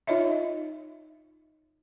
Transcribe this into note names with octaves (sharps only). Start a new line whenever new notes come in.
D#4 F4 C#5 D#5 E5